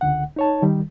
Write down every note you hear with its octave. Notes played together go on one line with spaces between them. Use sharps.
C#2 D3 F#5
D#4 C#5 A5
D#3 G3